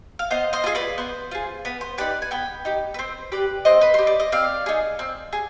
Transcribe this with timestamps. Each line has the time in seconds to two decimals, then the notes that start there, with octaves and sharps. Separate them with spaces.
0.19 F5
0.30 B3 C5 D#5
0.53 C5 D#5
0.64 F4 G#4 D#5
0.75 B4 D5
0.98 B3 C5
1.31 F4 G#4
1.65 B3 B4
1.81 C5
1.98 D#4 G4 B4 D5
2.22 G#5
2.31 B3 G5 B5
2.65 D#4 G4
2.94 B4
2.99 C4 C5
3.32 G4 B4 D5
3.65 C4 C5 D#5
3.81 B4
3.94 G4 C5
4.07 D5
4.20 D#5
4.32 C4 D5 F5
4.66 D#4 G#4
4.99 C4
5.33 G#4